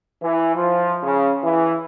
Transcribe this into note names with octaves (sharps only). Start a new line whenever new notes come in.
E3
F3
C#3
E3